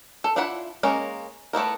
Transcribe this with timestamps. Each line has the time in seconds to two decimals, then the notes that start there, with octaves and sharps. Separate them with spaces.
0.24 A4
0.36 D4 E4 F4 F#5 B5
0.83 G#3 A#3 C#4 A#4
1.53 A3 B3 E4 A#4